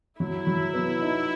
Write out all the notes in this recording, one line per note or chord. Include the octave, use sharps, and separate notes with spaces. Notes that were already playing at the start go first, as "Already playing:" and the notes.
F#3 E4
F#3
B3
D#4